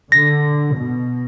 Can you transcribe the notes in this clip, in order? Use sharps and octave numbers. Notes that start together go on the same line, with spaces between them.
D3 A#6
B2